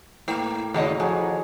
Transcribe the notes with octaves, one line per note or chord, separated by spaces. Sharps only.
A2 A#3 A#4
D#2 C#3 F#3 D#5
F2 F#4 G#4